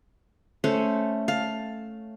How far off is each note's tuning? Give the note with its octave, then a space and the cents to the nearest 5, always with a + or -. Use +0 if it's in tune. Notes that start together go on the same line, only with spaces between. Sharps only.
A3 +0 C#4 +0 C5 +0
F5 +10 A5 +0